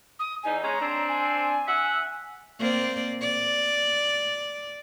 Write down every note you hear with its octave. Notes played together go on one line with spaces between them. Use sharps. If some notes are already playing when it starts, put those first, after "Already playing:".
D#6
E2 D#4 G#5
G#3 C#4 A#5
C4 D4
G#5
E5 F#5
A#3 C4 D5
D5